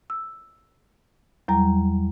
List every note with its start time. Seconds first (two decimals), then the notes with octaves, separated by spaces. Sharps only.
0.10 E6
1.48 E2 F#3 G3 A#5